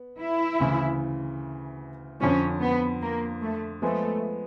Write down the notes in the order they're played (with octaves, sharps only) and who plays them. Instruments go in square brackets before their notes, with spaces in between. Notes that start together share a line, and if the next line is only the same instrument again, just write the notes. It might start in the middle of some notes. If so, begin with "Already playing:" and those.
Already playing: [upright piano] B3
[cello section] E4
[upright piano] D2 C#3 E3
[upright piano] F2 D3 F3 [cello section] C#4
[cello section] B3
A#3
A3
[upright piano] F3 G#3 B3 [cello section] A3